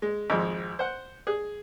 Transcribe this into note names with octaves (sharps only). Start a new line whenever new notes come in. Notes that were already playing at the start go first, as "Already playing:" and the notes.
G#3
G#1 F2 G#3
C5 F#5
G#4